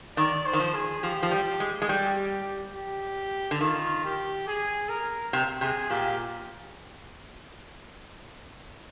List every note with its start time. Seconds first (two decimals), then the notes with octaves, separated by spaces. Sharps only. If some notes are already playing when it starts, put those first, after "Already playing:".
0.17 D#3 D5
0.46 C5
0.53 D#3
0.60 F3
0.74 G#4
1.03 F3 G4
1.23 F3
1.31 G3
1.60 G#3
1.82 G#3
1.89 G3 G4
2.75 G4
3.51 D3
3.61 D#3 F4
4.04 G4
4.47 G#4
4.89 A#4
5.33 C3
5.61 C3 G#4
5.90 A#2 G4